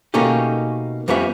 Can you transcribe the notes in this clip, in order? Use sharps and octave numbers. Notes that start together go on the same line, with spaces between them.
B2 A3 A#3 C#4 D#4 G4
F2 G3 B3 C#4 G#4 E5